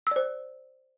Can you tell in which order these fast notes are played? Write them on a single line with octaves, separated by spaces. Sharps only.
E6 D5 C5